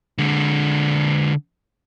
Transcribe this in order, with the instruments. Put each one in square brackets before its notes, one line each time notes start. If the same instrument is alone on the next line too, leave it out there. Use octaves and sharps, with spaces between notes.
[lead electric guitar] D3 G#3